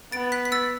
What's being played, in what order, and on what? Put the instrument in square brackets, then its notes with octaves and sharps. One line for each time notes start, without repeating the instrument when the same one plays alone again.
[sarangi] B3 [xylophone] A6 D7
[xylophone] F#6 B6
B6
E6 A6